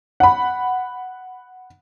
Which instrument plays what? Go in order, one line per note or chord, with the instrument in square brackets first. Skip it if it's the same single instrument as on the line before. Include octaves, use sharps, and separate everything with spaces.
[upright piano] F#5 B5